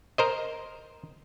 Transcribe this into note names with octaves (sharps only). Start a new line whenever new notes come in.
A#4 C5 D#5